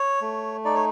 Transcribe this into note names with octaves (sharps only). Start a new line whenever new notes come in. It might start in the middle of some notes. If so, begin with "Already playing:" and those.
Already playing: C#5
A3
D#4 D5
C#5